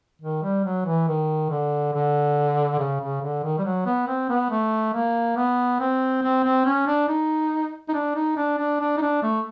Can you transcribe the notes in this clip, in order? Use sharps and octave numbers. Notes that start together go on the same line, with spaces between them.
D#3
G3
F#3
E3
D#3
D3
D3
C#3
C#3
D3
D#3
G3
F#3
B3
C4
B3
A3
A#3
B3
C4
C4
C4
C#4
D4
D#4
D#4
D4
D#4
D4
D4
D4
D#4
D4
A3